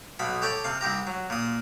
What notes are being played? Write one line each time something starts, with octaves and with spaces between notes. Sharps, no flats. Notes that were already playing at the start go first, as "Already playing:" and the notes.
B1 B2 B5
G4 A4 C#5 D5
C3 F5
C2 C4 G4 A#5
F#3
A#2 D#6